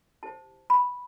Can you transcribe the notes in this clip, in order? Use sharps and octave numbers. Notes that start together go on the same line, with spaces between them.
E4 G4 C5 A5
B5